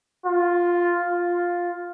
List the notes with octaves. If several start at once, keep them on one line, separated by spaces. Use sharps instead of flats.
F4
F4